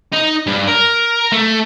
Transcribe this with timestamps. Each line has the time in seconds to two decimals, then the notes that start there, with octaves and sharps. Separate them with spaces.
0.13 D#4
0.47 G2
0.68 A#4
1.32 A3